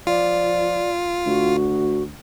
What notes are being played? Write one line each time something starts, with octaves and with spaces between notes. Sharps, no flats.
F3 F4 D5
D2 F#4